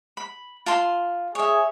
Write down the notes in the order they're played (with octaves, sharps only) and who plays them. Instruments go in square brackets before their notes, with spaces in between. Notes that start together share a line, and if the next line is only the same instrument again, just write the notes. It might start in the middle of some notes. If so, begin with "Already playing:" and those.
[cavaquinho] B5
F4 A5 C6
[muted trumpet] G#4 [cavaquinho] C#5 E5